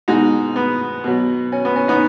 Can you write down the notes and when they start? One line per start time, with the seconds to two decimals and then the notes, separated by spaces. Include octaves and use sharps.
0.08 B2 G#3 D#4 F#4
0.56 B3
1.04 B2 F#3
1.52 C#4
1.65 B3
1.76 C#4
1.88 B3 D#4